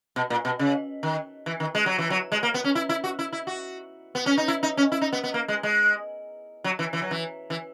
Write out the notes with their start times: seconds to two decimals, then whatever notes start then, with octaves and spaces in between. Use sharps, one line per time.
0.16 B2
0.30 A#2
0.45 B2
0.59 C#3
1.03 D#3
1.46 E3
1.60 D#3
1.75 G#3
1.86 F#3
1.98 E3
2.10 F#3
2.32 G#3
2.43 A#3
2.54 B3
2.64 C#4
2.75 E4
2.89 E4
3.04 F#4
3.19 E4
3.33 E4
3.47 F#4
4.15 B3
4.26 C#4
4.38 D#4
4.48 E4
4.63 D#4
4.77 C#4
4.92 E4
5.01 D#4
5.13 B3
5.24 B3
5.34 A#3
5.48 G#3
5.63 G#3
6.64 F#3
6.79 E3
6.93 E3
7.02 F#3
7.11 E3
7.50 E3